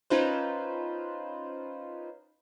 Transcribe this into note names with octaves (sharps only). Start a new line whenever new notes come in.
C#4 D#4 F4 B4 C5